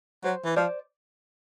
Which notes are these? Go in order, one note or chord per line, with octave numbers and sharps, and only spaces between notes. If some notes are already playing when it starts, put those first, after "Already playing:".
F#3 C5
E3
F3 C5 D5